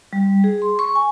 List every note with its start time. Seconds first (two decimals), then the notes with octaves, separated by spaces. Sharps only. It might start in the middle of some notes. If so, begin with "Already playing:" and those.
0.13 G3
0.44 G#4
0.62 C6
0.79 C#6
0.95 G#5